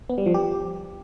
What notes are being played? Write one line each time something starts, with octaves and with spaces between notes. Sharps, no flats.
B3
G3
F3
G4